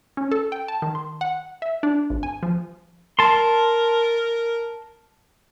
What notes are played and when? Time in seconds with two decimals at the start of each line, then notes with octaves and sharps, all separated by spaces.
0.17 C#4
0.32 A4
0.52 G5
0.68 A5
0.82 D#3
0.95 C6
1.21 F#5
1.62 E5
1.83 D4
2.10 G#1
2.23 G#5
2.43 F3
3.19 A#4 A5 C6